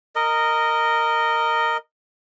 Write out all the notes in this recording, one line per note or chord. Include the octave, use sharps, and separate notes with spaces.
A#4 D#5